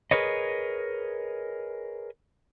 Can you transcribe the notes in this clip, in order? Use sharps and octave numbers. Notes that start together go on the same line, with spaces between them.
G#4 A#4 B4 C#5 D#5